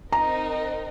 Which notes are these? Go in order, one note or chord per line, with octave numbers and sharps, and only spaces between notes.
C4 D#4 A#4 D#5 A#5